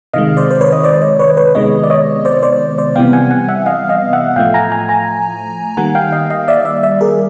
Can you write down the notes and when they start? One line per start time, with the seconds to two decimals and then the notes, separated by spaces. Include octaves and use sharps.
0.14 C3 D#3 G#3 D#5 F5
0.37 C5 D5
0.51 C5
0.61 B4 C#5
0.73 D#5
0.84 C5 D5
1.02 C#5 D#5
1.19 B4 C#5
1.37 B4 C#5
1.55 C3 D#3 G#3 B3 C#5 D#5
1.84 D5
1.90 C#5 D#5
2.25 C5 D5
2.43 C5 D5
2.78 C5 D5
2.95 C3 E3 G3 B3 F5 G5
3.13 F#5 G#5
3.31 F#5 G#5
3.48 E5 F#5
3.66 D#5 F5
3.89 D#5 F5
4.13 E5 F#5
4.36 A2 F3 A3 F5 G5
4.54 G#5 A#5
4.72 G#5 A#5
4.89 G#5 A#5
5.77 D#3 G3 A#3 F#5 G#5
5.95 F5 G5
6.12 D#5 F5
6.30 D#5 F5
6.48 D5 E5
6.65 D5 E5
6.83 D5 E5
7.01 G#4 A#4